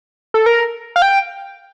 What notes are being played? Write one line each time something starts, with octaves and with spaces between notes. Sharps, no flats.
A4
A#4
F5
G5